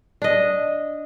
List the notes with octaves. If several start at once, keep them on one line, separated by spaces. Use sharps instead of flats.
D4 D#5